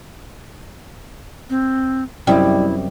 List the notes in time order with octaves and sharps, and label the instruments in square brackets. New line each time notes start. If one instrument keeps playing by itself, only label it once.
[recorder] C4
[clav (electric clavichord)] F#2 C3 D#5 [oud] G3 [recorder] E4